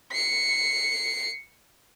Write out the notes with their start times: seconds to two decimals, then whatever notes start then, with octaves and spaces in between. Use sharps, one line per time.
0.12 C7 C#7